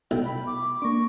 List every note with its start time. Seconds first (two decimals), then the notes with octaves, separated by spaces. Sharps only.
0.11 B1 G5
0.25 B5
0.47 D6
0.82 A#3 D4 C#6